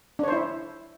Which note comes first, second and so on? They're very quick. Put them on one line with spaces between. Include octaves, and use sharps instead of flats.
D4 C#5 C5 E4